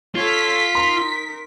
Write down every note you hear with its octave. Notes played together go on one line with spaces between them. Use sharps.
F4 A4 C#5 B6
D#4 A#4 C6